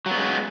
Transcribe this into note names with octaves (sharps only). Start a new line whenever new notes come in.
F#3 G#3 B3